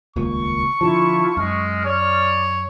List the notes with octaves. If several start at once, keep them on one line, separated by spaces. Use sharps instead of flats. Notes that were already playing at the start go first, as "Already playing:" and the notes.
D#1 C#2 A#2 C#6
D3 F3 E4 F4 A5
F#2 G#3 F6
C#5 D5